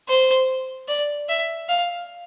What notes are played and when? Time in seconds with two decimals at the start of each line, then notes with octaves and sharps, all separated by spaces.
0.09 C5
0.88 D5
1.29 E5
1.69 F5